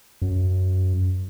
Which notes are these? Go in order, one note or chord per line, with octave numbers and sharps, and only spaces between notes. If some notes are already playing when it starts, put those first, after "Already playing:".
F#2